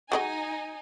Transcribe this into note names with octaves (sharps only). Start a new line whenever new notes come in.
F#3 G#3 D#4 D#5 G#5